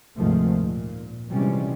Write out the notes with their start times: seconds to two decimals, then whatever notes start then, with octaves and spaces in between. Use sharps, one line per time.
0.16 D2 G#2 C3 D#3 F3 A3
0.63 A#2
1.30 C3 E3 F3 G3 G#3 C#4